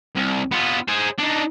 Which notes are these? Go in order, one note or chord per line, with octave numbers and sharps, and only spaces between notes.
C2
B3 F4
G#4 C5
D4 D#4